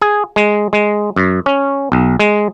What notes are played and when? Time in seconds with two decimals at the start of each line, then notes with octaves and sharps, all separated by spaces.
0.02 G#4
0.36 G#3
0.73 G#3
1.16 F#2
1.46 C#4
1.92 B1
2.20 G#3